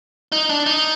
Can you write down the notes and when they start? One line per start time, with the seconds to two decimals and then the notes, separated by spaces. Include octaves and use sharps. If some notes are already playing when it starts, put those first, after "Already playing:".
0.32 D#4
0.50 D4
0.66 D#4